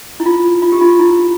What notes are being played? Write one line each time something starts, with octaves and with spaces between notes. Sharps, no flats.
E4
F4
F4
G4
F4
E4